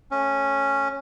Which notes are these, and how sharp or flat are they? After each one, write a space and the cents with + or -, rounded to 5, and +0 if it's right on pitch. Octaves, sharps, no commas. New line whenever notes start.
A3 +0 C#4 -5